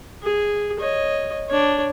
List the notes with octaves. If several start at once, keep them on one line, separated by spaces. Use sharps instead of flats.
G#4
C#5 D#5
D4 C#5